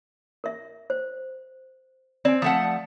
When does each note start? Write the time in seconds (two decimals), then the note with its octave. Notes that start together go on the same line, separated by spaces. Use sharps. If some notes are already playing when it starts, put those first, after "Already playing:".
0.44 A#4 E5
0.90 C5
2.25 C4 D5 G#5
2.42 F3 A3 F#5 D#6